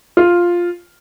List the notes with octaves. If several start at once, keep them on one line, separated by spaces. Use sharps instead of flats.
F4